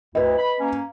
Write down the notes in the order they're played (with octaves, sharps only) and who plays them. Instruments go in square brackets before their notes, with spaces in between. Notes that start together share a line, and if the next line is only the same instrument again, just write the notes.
[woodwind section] D2 E4 [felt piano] B4 D#5
[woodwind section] B5
A#3 C#4